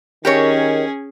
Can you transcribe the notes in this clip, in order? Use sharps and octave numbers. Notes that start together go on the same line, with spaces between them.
D#3 C#4 G4 G#4 A#4 C#5